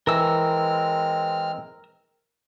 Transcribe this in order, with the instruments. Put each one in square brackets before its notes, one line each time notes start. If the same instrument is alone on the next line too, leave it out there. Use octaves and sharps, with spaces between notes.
[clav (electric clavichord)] E3 [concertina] G#3 C4 F6 [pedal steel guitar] A#4 E6